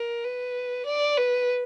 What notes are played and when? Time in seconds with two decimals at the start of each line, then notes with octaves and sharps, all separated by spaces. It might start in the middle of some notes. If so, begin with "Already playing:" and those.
Already playing: A#4
0.24 B4
0.86 D5
1.17 B4